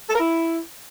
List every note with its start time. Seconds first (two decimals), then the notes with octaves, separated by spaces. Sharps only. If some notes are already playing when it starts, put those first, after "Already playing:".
0.08 A4
0.14 A#4
0.19 E4